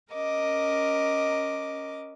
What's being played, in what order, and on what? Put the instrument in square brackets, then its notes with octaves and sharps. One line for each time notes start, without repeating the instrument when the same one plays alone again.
[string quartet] C#4 A#4 D#5 D6